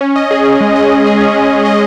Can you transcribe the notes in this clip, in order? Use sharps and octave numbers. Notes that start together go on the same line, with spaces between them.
C#4
D#5
G#4
G#4
G#3
D#5
G#3
G#4
C#4
G#3
C#4
D#5